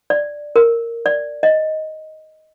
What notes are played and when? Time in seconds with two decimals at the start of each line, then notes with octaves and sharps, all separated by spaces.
0.10 D5
0.56 A#4
1.06 D5
1.43 D#5